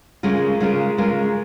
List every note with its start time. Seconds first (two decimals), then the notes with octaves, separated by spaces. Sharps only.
0.23 C#3 G#3 C#4 F4 A#4
0.60 C#3 G#3 C#4 F4 A#4
0.98 C#3 G#3 C#4 F4 A#4